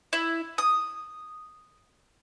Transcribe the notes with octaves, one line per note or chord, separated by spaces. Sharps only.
E4
D#6